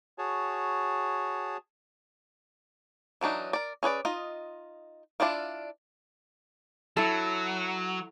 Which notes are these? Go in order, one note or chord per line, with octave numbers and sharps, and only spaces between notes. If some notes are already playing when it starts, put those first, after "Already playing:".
F#4 G#4 C#5 A5
E3 F#3 D4 D#4
A#4 D5
C#4 G#4 B4 D5
D#4 F4 D#5
D4 E4 F4 D5 F5
F#3 E4 A4